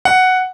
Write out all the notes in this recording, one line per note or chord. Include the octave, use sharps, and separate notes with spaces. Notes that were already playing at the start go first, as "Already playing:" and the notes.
F#5